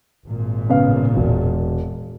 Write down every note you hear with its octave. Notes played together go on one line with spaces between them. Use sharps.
G#1 A#2
C#3 B3 F5
E1